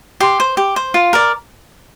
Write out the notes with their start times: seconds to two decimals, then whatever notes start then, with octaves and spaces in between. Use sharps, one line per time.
0.20 G4 C6
0.40 C5
0.57 G4
0.76 C5
0.94 F4
1.13 A#4 D5